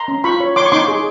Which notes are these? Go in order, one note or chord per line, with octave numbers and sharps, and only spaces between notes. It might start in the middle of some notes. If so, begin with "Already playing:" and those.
Already playing: A#5 C6
C#4
F4 B5 C#6
C#5
C#5 C6 D6
C#6
D#4 C6 D6
G#4